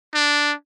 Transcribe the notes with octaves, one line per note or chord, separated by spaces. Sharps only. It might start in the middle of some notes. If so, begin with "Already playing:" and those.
D4